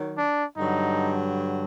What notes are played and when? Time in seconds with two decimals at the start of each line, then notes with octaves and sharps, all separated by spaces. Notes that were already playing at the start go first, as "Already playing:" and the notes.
Already playing: D#3 F#3
0.17 D4
0.57 G2 D3 F#3 D#4